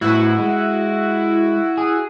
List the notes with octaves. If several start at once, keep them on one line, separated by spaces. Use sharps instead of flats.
A2 B3 E4 F#4
G#3
G#4